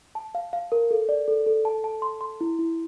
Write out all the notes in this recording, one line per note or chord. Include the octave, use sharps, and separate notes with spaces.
A5
F5
F5
A#4
A4
D5
A4
A4
A5
A5
C6
C6
E4
E4